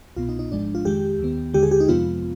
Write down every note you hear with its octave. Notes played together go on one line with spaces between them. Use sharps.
C2 B2 B3 F4
D#4
D#4
G#1 G#2 F3 G#3 D4
F4
F2 D#3 G#3 G4
D#2 D#3 B3
D#2 D3 G#3 G4
G#4
G4
D#4
F2 C3 F3 G#3 B3 F4